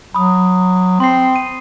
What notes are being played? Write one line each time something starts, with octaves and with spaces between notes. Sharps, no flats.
F#3 B5 D#6
C4 C6 C7
D#7